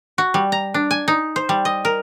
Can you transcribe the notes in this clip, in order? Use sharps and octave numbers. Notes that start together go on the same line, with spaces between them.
F#4
G3
A#5
D4
G#5
D#4
C5
G3
D#5
A#4